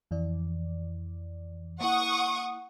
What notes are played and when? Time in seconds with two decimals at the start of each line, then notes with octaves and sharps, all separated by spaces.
0.11 F2 E3 D5
1.81 A#3 E4 F#5 C#6 D#6